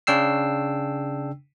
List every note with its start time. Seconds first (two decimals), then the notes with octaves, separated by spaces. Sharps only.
0.07 C#3 D4 G5 E6 C7